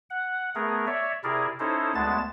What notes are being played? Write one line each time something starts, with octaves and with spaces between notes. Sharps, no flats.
F#5
A3 B3 G#4 A#4
C#5 D5 E5
C3 E4 G#4 A#4 D5
C#4 D#4 E4 A4 C5
D2 G#3 B3 A5 A6